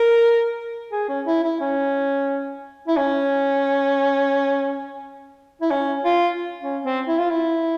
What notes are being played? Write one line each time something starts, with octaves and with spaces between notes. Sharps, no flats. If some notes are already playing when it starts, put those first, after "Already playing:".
Already playing: A#4
G#4
C#4
E4
E4
C#4
E4
C#4
E4
C#4
F4
C#4
C4
E4
F4
E4